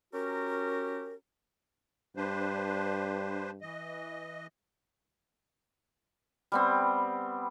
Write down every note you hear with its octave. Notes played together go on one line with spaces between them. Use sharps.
C#4 F#4 G4 A#4
G2 D4 B4 C5
E3 D#5
G3 B3 C4